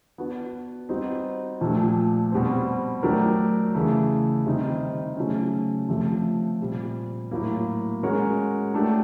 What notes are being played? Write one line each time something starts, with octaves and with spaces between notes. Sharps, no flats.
B3 D4 F#4 B4
G3 C4 D#4 F#4
A#2 F3 A3 D4 G4
B2 G3 C4
F#3 A3 D4 G4 A#4
C#3 E3 A3
C3 D#3 G3 C4 D#4
C#3 F#3 A3 C#4
C3 F3 A3
A#2 G3 C4
A2 F#3 A#3
G#3 C#4 F#4 A#4 C#5
A3 D4 G4